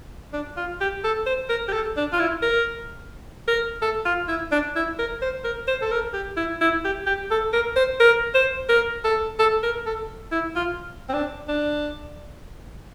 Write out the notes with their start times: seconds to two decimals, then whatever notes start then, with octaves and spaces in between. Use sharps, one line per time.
0.33 D4
0.57 F4
0.81 G4
1.04 A4
1.26 C5
1.49 A#4
1.68 G4
1.73 A4
1.97 D4
2.13 F4
2.20 E4
2.42 A#4
3.48 A#4
3.82 A4
4.05 F4
4.28 E4
4.52 D4
4.76 E4
4.99 A#4
5.22 C5
5.44 A#4
5.68 C5
5.82 A4
5.92 A#4
6.14 G4
6.37 E4
6.61 E4
6.84 G4
7.06 G4
7.31 A4
7.53 A#4
7.76 C5
8.00 A#4
8.34 C5
8.69 A#4
9.04 A4
9.39 A4
9.63 A#4
9.86 A4
10.32 E4
10.56 F4
11.09 C4
11.14 D4
11.48 D4